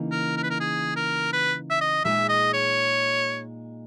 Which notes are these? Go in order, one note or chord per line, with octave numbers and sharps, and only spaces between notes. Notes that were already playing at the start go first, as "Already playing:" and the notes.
Already playing: C#3 E3 A#3 D#4
A#4
A#4
B4
A#4
G#4
A#4
B4
E5
D#5
A#2 G#3 D#4 G#4 E5
D#5
C#5